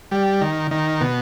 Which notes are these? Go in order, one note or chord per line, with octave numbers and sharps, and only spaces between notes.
G3
D#3
D#3
B2